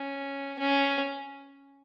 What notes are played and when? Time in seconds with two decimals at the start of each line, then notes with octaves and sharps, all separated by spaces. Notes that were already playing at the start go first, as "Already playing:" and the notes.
Already playing: C#4
0.59 C#4